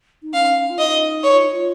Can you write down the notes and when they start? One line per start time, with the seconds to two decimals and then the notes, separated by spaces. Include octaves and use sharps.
0.23 D#4
0.34 C#4 F5
0.70 F4
0.79 D#4 D#5
1.24 C#5
1.32 F4
1.41 D#4
1.51 F4